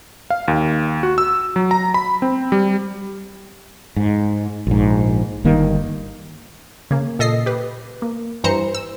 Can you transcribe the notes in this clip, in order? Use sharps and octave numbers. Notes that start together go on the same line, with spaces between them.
F5
D#2
F#4
E6
F#3
A#5
B5
C4
G3
G#2
A#1 G#2
G1 G2 D#3 A#3
C#3 A#3
A#2 A4 D#5 A#6 C7
G4 B4
A#3
G2 E3 C5 A#5 C#7
E6